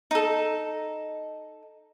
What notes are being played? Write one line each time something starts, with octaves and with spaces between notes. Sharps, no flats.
D#4 A4